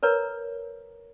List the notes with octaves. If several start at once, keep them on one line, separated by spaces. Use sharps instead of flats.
A#4 B4 C#5 A#5